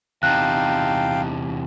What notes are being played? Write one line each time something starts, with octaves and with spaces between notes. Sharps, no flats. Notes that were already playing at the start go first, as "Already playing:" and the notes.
E2 C3 D#4 F5 G5 A5 F#6